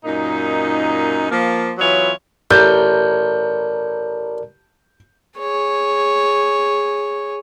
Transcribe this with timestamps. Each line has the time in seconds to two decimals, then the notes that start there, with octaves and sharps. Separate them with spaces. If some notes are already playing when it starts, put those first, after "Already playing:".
0.05 F#2 A#2 D#4
1.30 F3 A#3
1.78 E3 F#3 B3 F4 C#5
2.51 A1 A#4 D5 G6
5.39 G#4 C#5